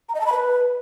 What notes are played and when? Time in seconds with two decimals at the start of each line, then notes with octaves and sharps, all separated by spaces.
0.09 A#5
0.15 D#5
0.20 A5
0.26 B5
0.32 B4